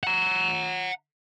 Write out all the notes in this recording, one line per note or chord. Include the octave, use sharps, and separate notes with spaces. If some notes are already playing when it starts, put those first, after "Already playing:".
F#5 A#5